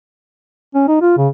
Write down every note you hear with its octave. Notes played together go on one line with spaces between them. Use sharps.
C#4
D#4
F4
C#3